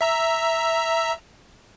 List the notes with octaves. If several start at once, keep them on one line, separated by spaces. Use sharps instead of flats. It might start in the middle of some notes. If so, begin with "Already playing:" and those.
E5 A#5 E6